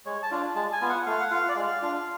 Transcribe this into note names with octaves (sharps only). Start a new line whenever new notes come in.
G#3 C#5
A5
D4 F4
G#3 A5
G#5
B3 F4
F#5
A3 F5
F#5
F4 F5
D5
G#3 F5
D4 F4